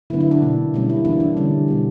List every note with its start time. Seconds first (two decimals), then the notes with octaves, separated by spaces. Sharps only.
0.10 D3 F#3 B3 D4 E4
0.20 E4
0.31 D4
0.42 B2 A#3 D4
0.74 B2 G3 A#3 C#4
0.90 E4
1.05 E3 B3 D4 E4
1.20 D4
1.37 D3 G3 C#4
1.68 B2 G3 B3